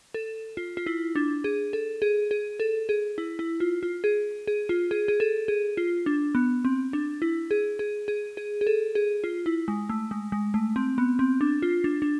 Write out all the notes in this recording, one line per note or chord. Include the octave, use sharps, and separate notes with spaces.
A4
F4
F4
E4
D4
G#4
A4
G#4
G#4
A4
G#4
E4
E4
F4
F4
G#4
G#4
F4
G#4
G#4
A4
G#4
F4
D4
B3
C4
D4
E4
G#4
G#4
G#4
G#4
G#4
A4
G#4
F4
E4
G#3
A3
G#3
G#3
A3
C4
B3
C4
D4
F4
D4
D4